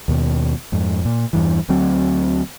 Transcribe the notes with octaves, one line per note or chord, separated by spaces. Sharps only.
D#2 B2
F2 G#2
A#2
E2 G2 E3
D2 D3 F#3 C4